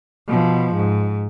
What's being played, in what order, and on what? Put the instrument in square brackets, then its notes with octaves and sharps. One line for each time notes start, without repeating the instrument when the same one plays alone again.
[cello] B2 F3
G#2